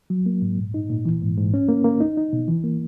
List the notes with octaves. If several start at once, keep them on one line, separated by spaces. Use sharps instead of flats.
F#3
A#3
G#2
A#2
D#4
A#2
E3
G#2
G#2
C#4
A#3
A#3
D#4
D#4
B2
E3
A#3